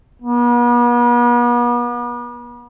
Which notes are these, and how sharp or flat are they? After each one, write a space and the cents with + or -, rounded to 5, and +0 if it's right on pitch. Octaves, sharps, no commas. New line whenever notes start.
B3 -40